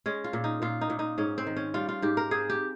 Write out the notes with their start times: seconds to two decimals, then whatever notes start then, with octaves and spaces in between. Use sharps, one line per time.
0.06 G#3 C#4
0.24 F4
0.33 A#2
0.44 D#4
0.62 A#2 F4
0.81 D#4
0.90 A#2
0.99 D#4
1.18 G#2 C#4
1.38 C4
1.47 D#3
1.56 C#4
1.74 G3 F4
1.89 F4
2.02 G#2 G4
2.17 A#4
2.31 C4 G#4
2.50 G4